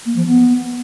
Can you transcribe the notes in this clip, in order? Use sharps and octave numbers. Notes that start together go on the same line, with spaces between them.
A#3
F3
B3